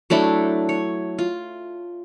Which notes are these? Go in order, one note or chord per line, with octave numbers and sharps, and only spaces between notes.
F#3 A3 D4 E4
C#5
F4